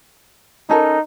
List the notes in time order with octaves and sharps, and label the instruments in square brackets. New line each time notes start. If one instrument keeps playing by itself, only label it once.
[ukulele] C#4 A4 A#4 [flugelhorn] D#4